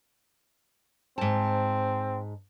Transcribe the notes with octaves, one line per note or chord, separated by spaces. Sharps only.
G#2 C4 A5